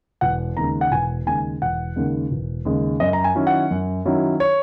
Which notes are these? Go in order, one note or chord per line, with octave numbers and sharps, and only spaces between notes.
E1 F#5
D#2 C#3 G#3 A#5
F#5
E1 G#5
D#2 C#3 G#3 G#5
E1 F#5
D#2 C#3 G#3
E1
D#2 C#3 G#3
F#2 D#5
A#5
G#5
D#3 F#3 C#4 E4
F#5
F#2
D#3 F#3 C#4 E4
C#5